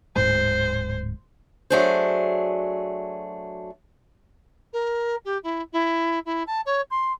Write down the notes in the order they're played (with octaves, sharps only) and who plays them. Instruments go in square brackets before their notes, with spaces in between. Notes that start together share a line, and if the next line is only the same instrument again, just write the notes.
[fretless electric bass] D1 G#2 G#3 [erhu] C5
[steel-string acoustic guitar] F#3 A3 D4 G#4 C5
[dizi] A#4
G4
E4
E4
E4
A5
C#5
C6